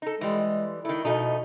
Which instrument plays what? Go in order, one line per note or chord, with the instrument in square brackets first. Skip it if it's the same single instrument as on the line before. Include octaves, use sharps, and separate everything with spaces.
[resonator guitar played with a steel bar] D#4 A4
[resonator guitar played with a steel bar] E3 G3 [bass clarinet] G#3
[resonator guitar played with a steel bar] D#3 A3 [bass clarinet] E4
[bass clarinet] B2 [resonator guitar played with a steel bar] F3 A3 D#4